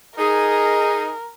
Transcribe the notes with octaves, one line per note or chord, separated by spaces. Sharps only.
D#4 G#4 A#4